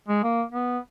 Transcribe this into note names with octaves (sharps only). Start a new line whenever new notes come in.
G#3
A#3
B3